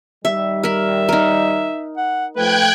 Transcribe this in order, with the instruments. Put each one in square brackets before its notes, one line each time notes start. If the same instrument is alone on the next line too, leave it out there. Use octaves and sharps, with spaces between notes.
[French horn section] D#3 G3 [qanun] E5
[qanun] A#4 B5 [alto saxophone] E5
[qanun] D#4 A#4
[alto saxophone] F#5
[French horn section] F3 A3 [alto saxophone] B4 [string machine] G5 F#6 G#6